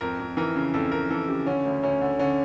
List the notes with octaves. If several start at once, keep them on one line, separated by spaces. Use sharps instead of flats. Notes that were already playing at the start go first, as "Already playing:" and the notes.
F2 A#4
F2
E3 A#4
C#3
F2 A4
F2 A#4
E3 A4
C#3 G4
D3 C#4
D2
D2 C#4
D3
D3 C#4